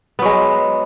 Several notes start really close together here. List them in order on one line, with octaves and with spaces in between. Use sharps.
B3 F#3 G#3